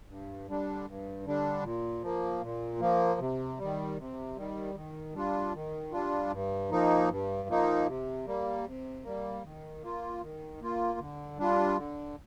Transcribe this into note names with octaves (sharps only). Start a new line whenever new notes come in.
G2
D3 G3 D4
G2
D3 G3 D4
A#2
F3 A#3
A#2
F3 A#3
C3
D#3 G3
C3
D#3 G3
D#3
G3 D4 F4
D#3
G3 D4 F4
G2
F3 A#3 D#4
G2
F3 A#3 D#4
C3
G3 A#3
C3
G3 A#3
D#3
A#3 F4
D#3
A#3 F4
D3
G3 D4 F4
D3